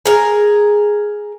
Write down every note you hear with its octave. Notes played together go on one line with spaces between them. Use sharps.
G#4 A#4